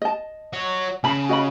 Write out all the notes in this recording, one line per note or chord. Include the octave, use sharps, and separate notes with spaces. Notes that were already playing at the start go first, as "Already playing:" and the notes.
D#5 A5
F#4 C#5
C#3 A5 B5
F#4 D#5 B5